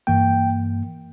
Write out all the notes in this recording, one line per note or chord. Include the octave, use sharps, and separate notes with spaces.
G2 E3 A#3 G5